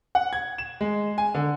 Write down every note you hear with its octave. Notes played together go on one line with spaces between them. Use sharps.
F#5
G#6
E7
G#3
G#5
D3